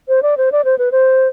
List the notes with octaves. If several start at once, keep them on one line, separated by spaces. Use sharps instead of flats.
C5
D5
C5
D5
C5
B4
C5